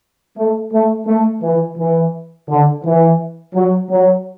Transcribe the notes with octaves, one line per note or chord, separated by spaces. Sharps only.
A3
A3
A3
E3
E3
D3
E3
F#3
F#3